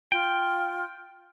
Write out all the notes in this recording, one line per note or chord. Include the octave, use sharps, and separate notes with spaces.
F4 G5